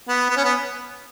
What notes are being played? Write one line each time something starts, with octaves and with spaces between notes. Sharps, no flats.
B3
B3
C#4
B3